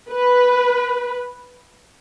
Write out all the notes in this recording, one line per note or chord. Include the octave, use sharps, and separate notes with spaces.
B4